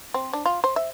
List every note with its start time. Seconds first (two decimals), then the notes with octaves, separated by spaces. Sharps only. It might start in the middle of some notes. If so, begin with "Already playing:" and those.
0.14 C4
0.33 D4
0.46 F4
0.64 C5
0.76 E5